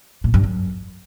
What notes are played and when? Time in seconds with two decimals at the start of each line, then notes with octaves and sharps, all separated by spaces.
0.24 A#2
0.34 G2
0.44 F#2